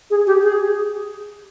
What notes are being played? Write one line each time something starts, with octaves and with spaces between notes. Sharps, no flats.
G#4
G4
G#4